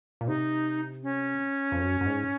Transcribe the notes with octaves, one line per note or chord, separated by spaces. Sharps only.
A#2
C3 D#4
C#4
F2
F#2
F#2
G#2